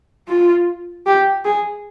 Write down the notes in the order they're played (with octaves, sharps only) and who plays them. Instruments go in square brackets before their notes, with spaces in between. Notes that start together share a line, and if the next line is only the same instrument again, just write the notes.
[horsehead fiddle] F4
G4
G#4